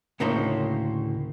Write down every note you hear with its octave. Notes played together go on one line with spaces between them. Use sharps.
D2 A2 C#3 A#3 D#4 C5